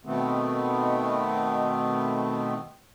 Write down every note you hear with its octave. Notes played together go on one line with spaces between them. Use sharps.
B2 D#3 A3 B3 C4